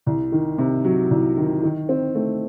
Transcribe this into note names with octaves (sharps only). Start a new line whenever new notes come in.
C2
D#3
C3
F#3
C2
D#3
D#3
C4
A3